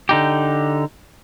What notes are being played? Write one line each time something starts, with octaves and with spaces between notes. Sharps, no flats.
D3 D#4 G4